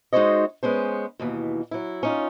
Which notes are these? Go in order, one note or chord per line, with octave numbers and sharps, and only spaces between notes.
G#3 D#4 F#4 C5 C#5 D#5
G#3 B3 C#4 C5
D#2 B2 E3
F#3 E4
C#4 D#4 F4